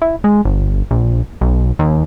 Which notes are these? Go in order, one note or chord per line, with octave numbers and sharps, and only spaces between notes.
E4
G#3
G1
A#1
B1
D#2